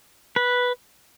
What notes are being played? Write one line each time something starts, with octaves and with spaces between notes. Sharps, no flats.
B4